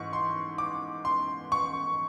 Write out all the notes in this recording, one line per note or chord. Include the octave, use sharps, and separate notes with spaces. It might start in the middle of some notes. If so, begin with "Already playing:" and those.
Already playing: G#2 E3 C#6
C6
D6
C6
C#6